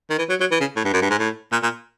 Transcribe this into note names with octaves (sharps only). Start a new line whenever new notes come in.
D#3
E3
F#3
F#3
E3
C#3
A2
G2
F#2
G2
G#2
A2
A#2
A#2